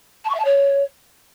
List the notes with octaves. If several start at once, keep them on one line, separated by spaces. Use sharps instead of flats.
A5
C#6
E5
A5
C#5